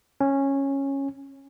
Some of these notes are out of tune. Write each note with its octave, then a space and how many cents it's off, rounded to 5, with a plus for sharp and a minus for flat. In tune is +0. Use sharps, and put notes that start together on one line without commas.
C#4 -10